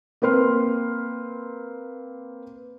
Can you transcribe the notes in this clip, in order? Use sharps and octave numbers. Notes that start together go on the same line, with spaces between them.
A#3 C4 B4 C6 F6